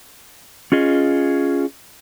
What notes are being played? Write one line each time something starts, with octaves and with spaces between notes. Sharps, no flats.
C#4 F4 G#4 D#5